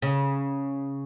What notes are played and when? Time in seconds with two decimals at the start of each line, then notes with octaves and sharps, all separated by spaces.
0.02 C#3